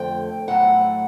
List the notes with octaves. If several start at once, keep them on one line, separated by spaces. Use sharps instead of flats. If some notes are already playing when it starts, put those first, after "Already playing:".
Already playing: F2 D3 F3 A3 G5
A2 F#3 A3 F#5